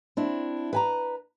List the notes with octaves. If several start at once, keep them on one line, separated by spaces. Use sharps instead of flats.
C4 D4 E4
B4 G#5 A#5